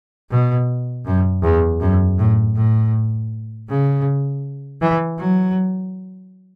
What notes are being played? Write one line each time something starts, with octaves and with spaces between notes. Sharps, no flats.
B2
F#2
E2
F#2
A2
A2
C#3
E3
F#3